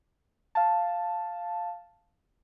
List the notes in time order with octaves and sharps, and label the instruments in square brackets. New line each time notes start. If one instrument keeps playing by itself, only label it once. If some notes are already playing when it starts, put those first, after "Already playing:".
[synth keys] F5 A5